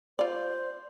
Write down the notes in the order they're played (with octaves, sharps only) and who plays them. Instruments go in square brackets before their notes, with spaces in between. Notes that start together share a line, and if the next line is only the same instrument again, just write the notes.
[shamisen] F4 D5 [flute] C5